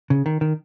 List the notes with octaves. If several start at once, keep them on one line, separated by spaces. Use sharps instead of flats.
C#3
D#3
D#3